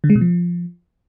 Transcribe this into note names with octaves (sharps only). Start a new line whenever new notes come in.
D3
G#3
B2
F3